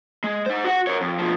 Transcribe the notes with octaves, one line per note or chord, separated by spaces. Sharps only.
G#3
D#4 C5
F#4 F#5
A#4 C#5
F2
B2 F3